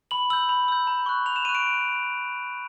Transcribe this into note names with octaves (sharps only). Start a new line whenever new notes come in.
B5 F#7
E6 G6 F#7
B5
E6 G6
A#5
C#6 F#6
A#5 F7
E7
C#6 F#6 D#7
D7